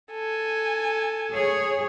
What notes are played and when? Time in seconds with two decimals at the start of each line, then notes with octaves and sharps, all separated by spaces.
0.12 A4 G#5
1.34 G#4 C#5